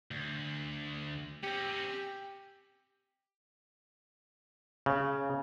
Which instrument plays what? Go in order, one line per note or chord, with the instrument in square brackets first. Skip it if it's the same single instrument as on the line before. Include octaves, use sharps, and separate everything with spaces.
[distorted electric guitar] D2
[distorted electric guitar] C4 C#4 [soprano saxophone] G4
[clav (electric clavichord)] C#3